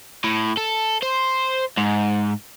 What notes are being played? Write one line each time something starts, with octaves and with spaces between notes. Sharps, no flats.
A2
A4
C5
G#2